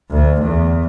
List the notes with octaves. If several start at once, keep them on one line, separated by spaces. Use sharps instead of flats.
D2
E2